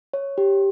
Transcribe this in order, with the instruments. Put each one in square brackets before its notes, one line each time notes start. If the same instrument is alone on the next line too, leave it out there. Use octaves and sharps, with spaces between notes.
[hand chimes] C#5
G4